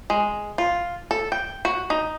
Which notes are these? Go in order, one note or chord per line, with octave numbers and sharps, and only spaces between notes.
G#3
F4
A4
G5
F#4
D#4